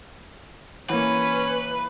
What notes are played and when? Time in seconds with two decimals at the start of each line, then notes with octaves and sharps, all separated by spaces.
0.90 E3 A#3 C#4 B4